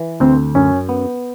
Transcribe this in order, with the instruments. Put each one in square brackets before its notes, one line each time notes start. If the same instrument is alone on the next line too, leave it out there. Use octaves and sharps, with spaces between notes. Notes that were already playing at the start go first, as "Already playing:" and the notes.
Already playing: [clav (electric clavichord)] E3
[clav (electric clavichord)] D2 [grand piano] C4
[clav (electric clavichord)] F#2 [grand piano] C#4
[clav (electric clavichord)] B3